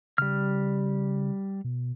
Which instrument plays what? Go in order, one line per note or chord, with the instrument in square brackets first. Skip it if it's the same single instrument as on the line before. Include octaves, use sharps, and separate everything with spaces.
[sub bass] C#3 [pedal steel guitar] G3 F6
[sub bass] B2